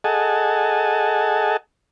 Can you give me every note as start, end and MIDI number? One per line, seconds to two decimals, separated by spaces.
0.04 1.57 68
0.04 1.57 69
0.04 1.57 75
0.04 1.57 78
0.04 1.57 80
0.04 1.57 81